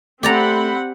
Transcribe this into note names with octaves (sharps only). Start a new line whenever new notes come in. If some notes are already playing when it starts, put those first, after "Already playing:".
A3 C4 G4 D5 F#5 A#5 B5